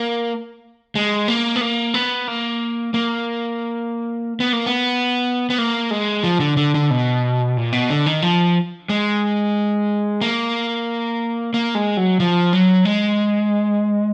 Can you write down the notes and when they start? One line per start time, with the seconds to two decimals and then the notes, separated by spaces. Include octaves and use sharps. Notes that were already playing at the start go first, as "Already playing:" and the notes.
Already playing: A#3
0.95 G#3
1.28 A#3
1.56 B3
1.61 A#3
1.94 B3
2.28 A#3
2.94 A#3
4.40 B3
4.53 A#3
4.66 B3
5.50 B3
5.58 A#3
5.91 G#3
6.24 F3
6.40 D3
6.57 D3
6.74 D3
6.90 B2
7.57 A#2
7.72 B2
7.90 D3
8.06 D#3
8.22 F3
8.89 G#3
10.21 A#3
11.54 A#3
11.75 G#3
11.97 F#3
12.20 F3
12.53 F#3
12.85 G#3